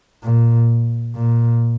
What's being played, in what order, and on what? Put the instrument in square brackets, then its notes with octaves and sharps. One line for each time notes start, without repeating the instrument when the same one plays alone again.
[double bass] A#2
A#2